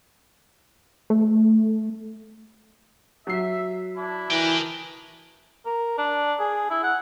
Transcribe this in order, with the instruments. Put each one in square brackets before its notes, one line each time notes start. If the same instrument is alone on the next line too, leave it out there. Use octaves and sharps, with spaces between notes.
[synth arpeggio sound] A3
[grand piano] F#3 C7 [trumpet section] E5
[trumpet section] D4 E4
[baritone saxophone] E3 [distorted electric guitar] A#4 G5
[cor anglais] A#4
D4
G#4
E4
F#5